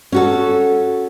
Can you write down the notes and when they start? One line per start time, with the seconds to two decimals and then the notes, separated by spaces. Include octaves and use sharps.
0.12 C#4 F#4 A4